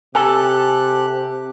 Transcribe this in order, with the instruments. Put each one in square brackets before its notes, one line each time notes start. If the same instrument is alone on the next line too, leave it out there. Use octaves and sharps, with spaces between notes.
[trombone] C3 [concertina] G4 F#6 [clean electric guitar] A4 [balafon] G#5